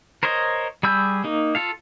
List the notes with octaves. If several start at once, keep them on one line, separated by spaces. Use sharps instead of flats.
A#4 C5 C#5 D#5
G3 G#4 B5 E6 G6
A#3 D#4
F4 A4 F5